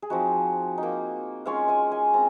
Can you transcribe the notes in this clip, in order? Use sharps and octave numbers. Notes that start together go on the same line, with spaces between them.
G#4
F3 C4 D#4 F#4
D#4
A#3
G#3 C#4 F4 C#5 F5
F5 G#5
G#5 C6
G#3 C4 F4 A#5